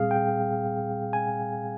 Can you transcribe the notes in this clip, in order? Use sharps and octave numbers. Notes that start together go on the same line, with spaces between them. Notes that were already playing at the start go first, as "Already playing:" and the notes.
Already playing: A#2 G3 C4 G#4 F5
G5
G#5